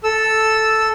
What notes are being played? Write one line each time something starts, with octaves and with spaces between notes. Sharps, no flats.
A4 E6